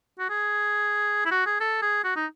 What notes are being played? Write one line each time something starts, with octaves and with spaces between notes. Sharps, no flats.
F#4
G#4
E4
F#4
G#4
A4
G#4
F#4
D#4